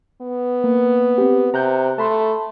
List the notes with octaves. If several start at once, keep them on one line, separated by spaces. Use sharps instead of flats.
B3
A#3
C4 G4
C3 A#5 F#6 G6
A3 A5 B5 C6